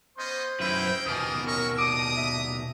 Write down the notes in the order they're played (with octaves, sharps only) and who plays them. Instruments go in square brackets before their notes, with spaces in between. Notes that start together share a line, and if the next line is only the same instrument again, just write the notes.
[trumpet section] B3 C#4 D#5 [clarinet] C5 [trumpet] C6
[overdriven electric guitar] F#2 B4 [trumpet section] A#3 D#4 G5 [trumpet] E4
[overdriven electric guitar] D#2 B2 [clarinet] E3 [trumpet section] C#4 F4 A#4 [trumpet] D#6
[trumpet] C#4 [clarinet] A#4 [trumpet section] E5 A#5 C#6
[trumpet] D4 [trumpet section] A#5 D#6 [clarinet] D6
[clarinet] E5